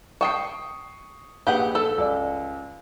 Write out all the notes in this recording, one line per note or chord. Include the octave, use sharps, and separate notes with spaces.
G5 A5 C#6 D#6 C7
A#1 G4 G#4 B4 F#5
A4
C#2 D5